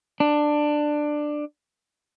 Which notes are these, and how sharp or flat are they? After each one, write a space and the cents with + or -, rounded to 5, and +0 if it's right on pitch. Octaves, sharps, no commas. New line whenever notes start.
D4 +15